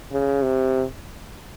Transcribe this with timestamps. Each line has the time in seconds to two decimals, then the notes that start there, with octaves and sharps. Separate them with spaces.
0.12 C#3
0.42 C3